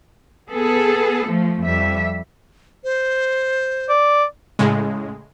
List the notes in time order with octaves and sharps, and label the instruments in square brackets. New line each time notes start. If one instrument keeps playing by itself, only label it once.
[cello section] B3 G#4 A4
F3 A3
F2 G3 E5
[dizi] C5
[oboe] D5
[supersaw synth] A2 C#3 G#3